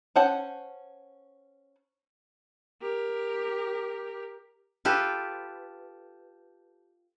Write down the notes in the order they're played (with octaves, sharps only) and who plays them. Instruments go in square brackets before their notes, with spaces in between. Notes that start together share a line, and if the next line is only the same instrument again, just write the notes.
[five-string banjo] C#4 C5 F#5 A5
[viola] G4 A#4
[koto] F4 G4 A4 B4